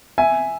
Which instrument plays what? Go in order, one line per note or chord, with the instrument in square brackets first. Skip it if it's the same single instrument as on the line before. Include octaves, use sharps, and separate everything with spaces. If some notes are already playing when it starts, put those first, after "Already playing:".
[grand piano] E5 G#5